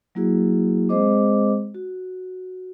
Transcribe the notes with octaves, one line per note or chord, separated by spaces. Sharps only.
F#3 A#3 E4 F#4 G#4
G#3 C4 G#4 C5 D#5 D6
F#4